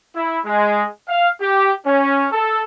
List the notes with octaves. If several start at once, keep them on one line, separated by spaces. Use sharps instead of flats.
E4
G#3
F5
G4
C#4
A4